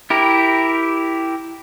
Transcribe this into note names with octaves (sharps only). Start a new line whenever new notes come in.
E4 G4 A#4